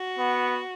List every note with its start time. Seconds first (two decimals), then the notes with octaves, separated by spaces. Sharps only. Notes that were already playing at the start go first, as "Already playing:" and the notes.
Already playing: F#4
0.19 B3